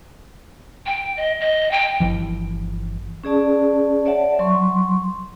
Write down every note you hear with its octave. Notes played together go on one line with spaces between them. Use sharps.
G5
D#5
D#5
G5
G1 E3 F3
C#4 G#4 D5 A5
C#5 D5 E5 F#5 A5
F#3 C6 C#6